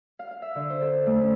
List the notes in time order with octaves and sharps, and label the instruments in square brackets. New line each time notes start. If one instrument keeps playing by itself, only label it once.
[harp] F5
F5
E5
D3
C5
A4
A3
C#4